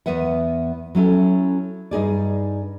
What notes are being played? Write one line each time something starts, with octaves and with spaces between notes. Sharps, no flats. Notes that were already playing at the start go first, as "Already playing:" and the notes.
E2 B3 B4 E5 F#5
F#3 C#4 E4 A4
G2 D#4 G#4 D5